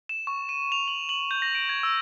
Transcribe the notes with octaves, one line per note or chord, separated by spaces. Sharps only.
E7
C#6
D#7
F7
F#7
F#7
G6
A#6
D7
G#6
E6